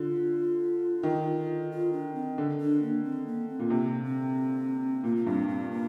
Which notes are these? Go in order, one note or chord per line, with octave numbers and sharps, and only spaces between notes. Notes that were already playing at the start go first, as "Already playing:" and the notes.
Already playing: D3 F4
D#3
F4
D4
C4
D3
D4
A#3
C4
A#3
C4
A#2
C3 A#3
C4
A#2 A#3
A#3
G2 C4
C4
A#3